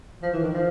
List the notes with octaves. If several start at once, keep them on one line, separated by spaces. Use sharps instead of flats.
F3
E3
D#3
F3